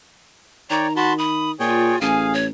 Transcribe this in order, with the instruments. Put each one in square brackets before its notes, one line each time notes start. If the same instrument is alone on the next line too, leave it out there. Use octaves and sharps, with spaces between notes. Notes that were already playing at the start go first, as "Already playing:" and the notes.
[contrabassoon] D#3 [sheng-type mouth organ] C#5 D5 G5 [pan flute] A#5
[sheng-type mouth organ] F#4 A5 B5 [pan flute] C6
[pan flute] B5 [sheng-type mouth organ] D#6
[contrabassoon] A#2 [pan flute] F4 [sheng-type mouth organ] G#4 C#5 G5
[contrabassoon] A1 [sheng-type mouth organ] G#4 F5 [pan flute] G#5
[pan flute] C#5